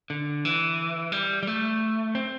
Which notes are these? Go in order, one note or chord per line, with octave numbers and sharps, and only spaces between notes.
D3
E3
G3
G3
A3
C4